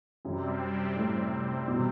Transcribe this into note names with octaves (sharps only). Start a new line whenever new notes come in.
F#2 C3 G3 C4
A2
B2
C3